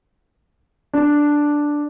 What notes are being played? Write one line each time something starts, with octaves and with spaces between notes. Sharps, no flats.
D4